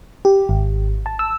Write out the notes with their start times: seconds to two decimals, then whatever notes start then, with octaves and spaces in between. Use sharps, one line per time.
0.25 G4
0.49 G#1
1.06 A5
1.19 E6